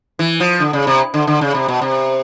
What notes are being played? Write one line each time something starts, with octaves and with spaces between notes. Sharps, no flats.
E3
F3
D3
C#3
C3
D3
D3
C#3
C3
B2
C3